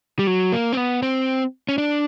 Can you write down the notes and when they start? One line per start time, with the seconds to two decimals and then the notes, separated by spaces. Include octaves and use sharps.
0.19 G3
0.27 F#3
0.52 A#3
0.72 C4
0.77 B3
1.02 C4
1.69 C#4
1.78 D4